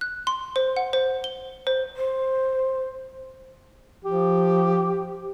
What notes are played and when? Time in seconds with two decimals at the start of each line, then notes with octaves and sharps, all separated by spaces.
0.01 F#6
0.27 C6
0.56 C5
0.77 F#5
0.93 C5
1.24 G7
1.67 C5
1.96 C5
4.04 F3 G4